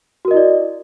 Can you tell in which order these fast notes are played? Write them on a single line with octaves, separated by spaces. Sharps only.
F#4 A#4 D#5 E4 D5